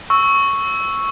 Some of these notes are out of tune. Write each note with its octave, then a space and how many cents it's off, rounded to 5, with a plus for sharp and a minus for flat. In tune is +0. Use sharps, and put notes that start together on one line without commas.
C#6 +0 E6 +0